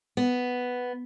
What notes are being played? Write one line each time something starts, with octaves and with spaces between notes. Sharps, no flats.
B3